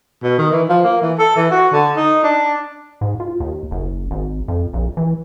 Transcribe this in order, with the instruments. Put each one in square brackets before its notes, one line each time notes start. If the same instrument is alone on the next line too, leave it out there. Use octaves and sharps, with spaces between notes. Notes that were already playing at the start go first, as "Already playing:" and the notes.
[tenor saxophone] B2
D#3
E3
F3
A#3
E3
A4
E3
F#4
D3
D#4
D4
[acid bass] G#2
F4
D#2
F#1
G#1
F2
A#1
E3